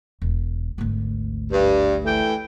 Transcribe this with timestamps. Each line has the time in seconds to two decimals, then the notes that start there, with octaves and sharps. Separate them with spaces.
0.22 E1
0.78 G#1 D2
1.52 G2
2.05 E3 A3 G5